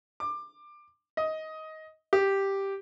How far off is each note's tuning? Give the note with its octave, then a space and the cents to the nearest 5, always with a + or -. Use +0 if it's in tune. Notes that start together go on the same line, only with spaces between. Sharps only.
D6 +20
D#5 +15
G4 +0